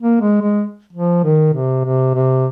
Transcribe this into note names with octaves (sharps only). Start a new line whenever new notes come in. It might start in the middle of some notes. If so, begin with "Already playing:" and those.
A#3
G#3
G#3
F3
D#3
C3
C3
C3